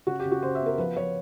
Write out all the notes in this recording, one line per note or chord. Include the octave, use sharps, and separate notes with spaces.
C#3 F#4
G4
C#3
F#4
C#3 C5
E5
B3 A#4
F3 B4
F3 C#5